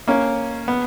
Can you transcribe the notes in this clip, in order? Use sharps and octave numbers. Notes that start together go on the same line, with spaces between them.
A#3 C#4
B3